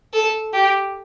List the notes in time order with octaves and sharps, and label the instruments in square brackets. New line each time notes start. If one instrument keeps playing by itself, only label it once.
[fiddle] A4
G4